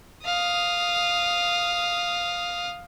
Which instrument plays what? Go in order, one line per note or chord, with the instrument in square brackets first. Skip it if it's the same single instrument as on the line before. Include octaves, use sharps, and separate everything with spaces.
[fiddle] F5 D#6